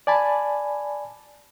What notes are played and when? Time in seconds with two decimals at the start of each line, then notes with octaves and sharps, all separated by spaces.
0.07 D5 G#5 A5 B5